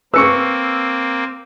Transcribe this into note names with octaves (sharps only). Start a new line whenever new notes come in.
A#3 C4 B4 C#6 E6 C#7